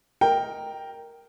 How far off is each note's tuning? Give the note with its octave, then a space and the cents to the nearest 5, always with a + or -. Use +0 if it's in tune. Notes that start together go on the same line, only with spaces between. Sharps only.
A#4 +0 D#5 +0 G5 +0